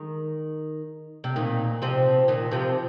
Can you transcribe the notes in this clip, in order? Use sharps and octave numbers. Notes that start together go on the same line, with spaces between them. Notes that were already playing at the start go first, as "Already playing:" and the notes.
Already playing: D#3 G#3
C3
A#2 D#3
C3 F3
A#2 D#3
C3 F3